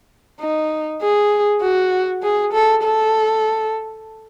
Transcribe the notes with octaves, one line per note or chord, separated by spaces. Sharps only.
D#4
G#4
F#4
G#4
A4
A4